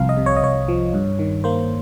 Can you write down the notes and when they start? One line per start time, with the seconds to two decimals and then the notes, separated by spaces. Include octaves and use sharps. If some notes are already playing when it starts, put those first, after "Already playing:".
Already playing: C2 F3 F5
0.09 D#5
0.17 C3
0.26 C#5
0.37 D#5
0.42 C2 C#5
0.68 F3
0.94 G2
1.19 D#3
1.44 A#3 C5